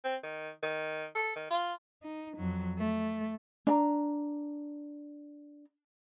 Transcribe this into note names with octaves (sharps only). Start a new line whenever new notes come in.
C4
D#3
D#3
A4
D#3
F4
D#4
F2 F#3
A3
D4 A#5